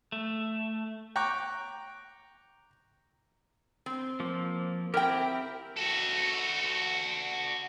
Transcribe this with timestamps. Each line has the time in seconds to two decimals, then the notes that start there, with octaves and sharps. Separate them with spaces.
0.12 A3
1.16 G5 A#5 C#6 D6 F#6
3.86 C4
4.20 F3 A#3
4.94 C4 E4 G4 A#4 G5
5.77 F#4 A4